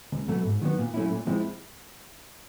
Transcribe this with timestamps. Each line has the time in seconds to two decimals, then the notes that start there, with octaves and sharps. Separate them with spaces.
0.12 C#2
0.28 B2 F#3 A3
0.45 G#2
0.62 D#3 F#3 B3
0.78 A#2
0.94 F#3 A3 C#4 E4
1.10 A#2
1.27 F3 G#3 C4 E4